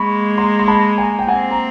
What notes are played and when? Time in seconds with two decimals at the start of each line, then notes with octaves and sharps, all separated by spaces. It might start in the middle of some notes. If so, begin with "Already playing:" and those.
Already playing: G#3 A#3 B5 C#6
0.38 A#5 C6
0.59 C6
0.67 A5 B5
0.98 G#5 A#5
1.19 G5
1.27 A#3 C4 F#5 G#5
1.51 A#5